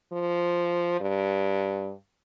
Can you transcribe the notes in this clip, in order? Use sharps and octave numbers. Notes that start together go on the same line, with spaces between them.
F3
G2